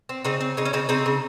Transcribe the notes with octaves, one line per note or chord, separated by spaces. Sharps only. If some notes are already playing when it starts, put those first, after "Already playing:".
C4
C#3 C4 D#4
C4
C#3 D#4
C#4
C#3 C4 D#4
C#3 C4 D#4
C#3